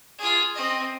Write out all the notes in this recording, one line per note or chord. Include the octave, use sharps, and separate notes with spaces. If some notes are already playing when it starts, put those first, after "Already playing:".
F4 G#4
C4 D#5